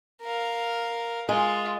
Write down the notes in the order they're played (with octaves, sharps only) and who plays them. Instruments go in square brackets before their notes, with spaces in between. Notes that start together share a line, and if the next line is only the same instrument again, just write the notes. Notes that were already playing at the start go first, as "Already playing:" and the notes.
[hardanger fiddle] A#4 F5
[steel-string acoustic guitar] G#3 [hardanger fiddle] F4